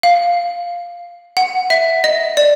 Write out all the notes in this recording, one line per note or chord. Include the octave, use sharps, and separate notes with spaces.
F5
F#5
E5
D#5
D5